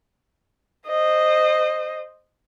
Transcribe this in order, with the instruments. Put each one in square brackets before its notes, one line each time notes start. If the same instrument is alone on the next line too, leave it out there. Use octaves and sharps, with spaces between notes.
[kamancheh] C5 D#5